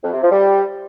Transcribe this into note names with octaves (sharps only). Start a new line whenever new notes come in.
F2
C3
F3
G3